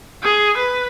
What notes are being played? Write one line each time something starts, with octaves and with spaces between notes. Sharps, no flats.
G#4
B4